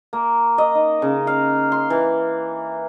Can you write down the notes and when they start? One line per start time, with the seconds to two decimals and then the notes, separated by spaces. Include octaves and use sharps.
0.13 A#3
0.58 D#5
0.75 D#4
1.02 C#3
1.27 F5
1.72 C6
1.90 E3